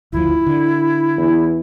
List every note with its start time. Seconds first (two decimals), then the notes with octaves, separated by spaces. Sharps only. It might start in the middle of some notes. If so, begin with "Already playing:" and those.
0.13 F#1 D2 F3 E4
0.46 D3
1.18 E2